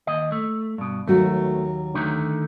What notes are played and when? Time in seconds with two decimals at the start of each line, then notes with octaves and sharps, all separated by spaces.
0.07 D#2 D#5
0.32 A3
0.78 G2 B2
1.08 D#2 F#3 A3 F#4
1.94 D3 D#3 A3